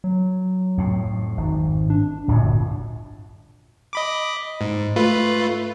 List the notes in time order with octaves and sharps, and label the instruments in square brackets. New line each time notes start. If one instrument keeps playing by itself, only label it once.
[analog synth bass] F#3
[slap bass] F2 A2
[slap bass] G#1 [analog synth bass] G#2
[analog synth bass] D4
[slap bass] D1 G1 F#2 [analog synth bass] A#2
[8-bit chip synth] D#5 B5 D6
G#2
A3 F4 B4